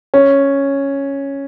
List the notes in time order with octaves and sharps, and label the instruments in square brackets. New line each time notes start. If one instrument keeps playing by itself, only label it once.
[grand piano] C#4